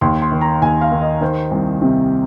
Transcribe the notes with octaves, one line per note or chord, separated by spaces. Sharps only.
D#2 C6
C6
D#3
A#5
D#2 G#5
F5
D#3
D#5
D#3 C5
C2
C3